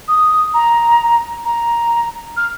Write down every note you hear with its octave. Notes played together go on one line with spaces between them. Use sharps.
D#6
A#5
A#5
F6